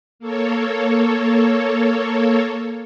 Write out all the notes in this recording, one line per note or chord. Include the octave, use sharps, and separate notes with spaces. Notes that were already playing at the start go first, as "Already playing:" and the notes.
A#3 A4 C#5